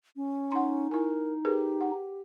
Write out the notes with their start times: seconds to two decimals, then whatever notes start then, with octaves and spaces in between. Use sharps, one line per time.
0.16 C#4
0.52 D#4 F#5 C6
0.91 E4 A#4 G#5
1.45 G4 G#4 A#4 B4
1.81 F#5